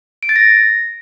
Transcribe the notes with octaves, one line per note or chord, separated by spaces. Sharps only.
D7
A6
A#6